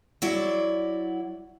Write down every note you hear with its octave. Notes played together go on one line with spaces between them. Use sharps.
F#3 E4 D5